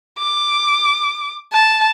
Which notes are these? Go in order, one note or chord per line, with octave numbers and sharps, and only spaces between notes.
D6
A5